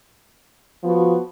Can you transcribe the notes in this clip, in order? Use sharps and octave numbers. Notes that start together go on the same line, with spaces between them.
F3 B3 F#4